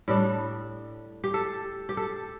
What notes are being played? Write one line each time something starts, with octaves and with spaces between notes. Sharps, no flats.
A2 G3 D4
G4
A4
G4
A4